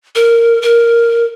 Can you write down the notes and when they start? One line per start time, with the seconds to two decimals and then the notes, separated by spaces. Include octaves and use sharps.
0.15 A#4
0.62 A#4